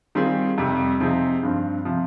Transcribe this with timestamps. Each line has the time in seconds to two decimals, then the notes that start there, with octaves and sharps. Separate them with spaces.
0.15 D#3 G3 C4 F4 G#4
0.58 F2 C3 G3
1.00 C3 F3 C4 D#4 G#4
1.43 G2 F3 C4
1.85 C3 F3